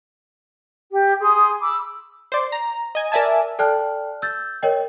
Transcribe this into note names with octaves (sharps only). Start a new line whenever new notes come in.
G4
G#4 C6 D#6
B5 D6 E6
C5 D5
A#5
D#5 G#5
A#4 D5 E5 G#5 A5
A4 D5 G5 A5 F6 F#6
E6 G6 A6
A#4 C#5 D#5 G5